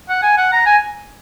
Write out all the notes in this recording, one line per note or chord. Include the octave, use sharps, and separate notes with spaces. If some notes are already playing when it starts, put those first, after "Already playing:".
F#5
G#5
F#5
A#5
G#5